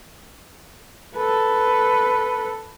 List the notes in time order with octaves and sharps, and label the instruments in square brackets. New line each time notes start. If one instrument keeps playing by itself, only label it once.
[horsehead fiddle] A4 B4